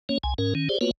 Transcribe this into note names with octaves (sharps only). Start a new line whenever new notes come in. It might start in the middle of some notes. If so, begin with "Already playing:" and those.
A#3 C#4 C#5
C2 G#5
G#2 C#4 A#4
D#3 C#4
G4 G#4 C5 D5
A#3 B3 F4 F#4 B4 C#5